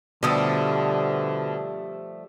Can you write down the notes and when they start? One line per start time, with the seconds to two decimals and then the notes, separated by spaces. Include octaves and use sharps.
0.23 B2 D3 F3 G3 A3 D#6 E6